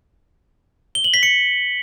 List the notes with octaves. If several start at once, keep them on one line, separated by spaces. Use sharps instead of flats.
G7
F#7
B6
C#7